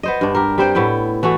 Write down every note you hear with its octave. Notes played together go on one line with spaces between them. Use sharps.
B3 C5 D#5
G2 D4
G4 A#4
G3 C4 C5 G5
A2 B3 E4 G5
E3 A3 F#4 A4